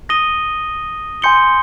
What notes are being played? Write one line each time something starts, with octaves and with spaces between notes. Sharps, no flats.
D#6 A#6 D#7 G7
G#5 C6 G6 C#7 G7